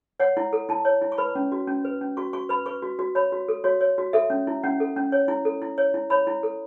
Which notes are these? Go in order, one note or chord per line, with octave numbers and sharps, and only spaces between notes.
C#5 F#5
E4
A4
E4 A5
C#5
E4
C#6
B4 B5
C#4
F#4
C#4
B4
C#4
F#4 C#6
F#4 C#6
B4 B5
B4 C#6
F#4
F#4
C#5 B5
F#4
A4
F#4 C#5
C#5
F#4
A4 E5
C#4
E4
C#4 F#5
A4
C#4
C#5
E4
A4
E4
C#5
E4
C#5 B5
E4
A4